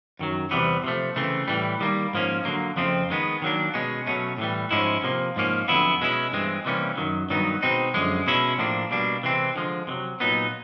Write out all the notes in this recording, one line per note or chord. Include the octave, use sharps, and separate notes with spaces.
F#2 D#3 F#3
E2 C3 E3 G3 B3
C3 F3 A3
C#3 E3 A3 C4
A2 E3 G3
D#3 G3 A#3
G#2 F3 A#3 C#4
D3 F#3 A#3
F2 C#3 F3 A3 C4
D#3 G#3 B3
D#3 F#3 A#3 D4
B2 G#3 C#4
B2 F#3 A3 C#4
A2 E3 G3
G#2 F3 G#3 C#4 E4
C3 F3 A#3
G#2 F3 A#3 C#4
F2 D3 F#3 B3 E4
B2 G#3 C#4 E4
G2 E3 G#3 C4
C3 E3 G3 A#3 C#4
F#2 D#3 F#3
G2 D#3 F#3 B3 D#4
B2 G#3 C4 D#4
F#2 D3 F3 G#3
B2 G#3 C#4 E4
A2 F3 A#3 D4
B2 G3 A#3 D4
C3 E3 G#3 C4
D3 F3 G#3
C3 D#3 F#3
A#2 F#3 B3 D#4